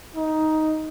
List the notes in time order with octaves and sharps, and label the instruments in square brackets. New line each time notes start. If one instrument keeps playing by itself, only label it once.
[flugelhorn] D#4